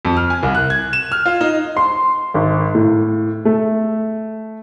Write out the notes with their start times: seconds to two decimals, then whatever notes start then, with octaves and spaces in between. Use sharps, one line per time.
0.05 F2
0.17 F6
0.30 G#5
0.43 C2
0.55 F#6
0.70 G#6
0.93 E7
1.12 F6
1.26 F4
1.41 D#4
1.77 C6
2.34 G#1
2.74 A2
3.45 A3